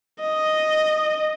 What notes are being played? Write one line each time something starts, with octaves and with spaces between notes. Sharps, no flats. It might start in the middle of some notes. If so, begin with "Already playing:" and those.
D#5